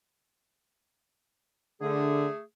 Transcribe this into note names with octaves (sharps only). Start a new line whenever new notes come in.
D3 A3 G#4